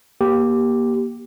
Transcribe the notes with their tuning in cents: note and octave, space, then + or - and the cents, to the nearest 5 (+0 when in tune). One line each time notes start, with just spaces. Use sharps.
A#3 +25 G4 -5